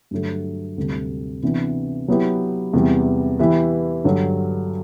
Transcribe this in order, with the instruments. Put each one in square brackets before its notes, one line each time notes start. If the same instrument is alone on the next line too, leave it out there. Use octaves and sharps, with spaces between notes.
[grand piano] G2 D3 F#3 A3
D2 C3 G3
C3 E3 B3 D4
F#3 B3 E4 G4
E2 C3 E3 G3
E3 B3 E4 G4 B4
G2 D3 F#3